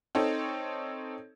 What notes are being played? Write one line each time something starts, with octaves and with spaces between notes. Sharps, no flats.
C4 D#4 A4 C#5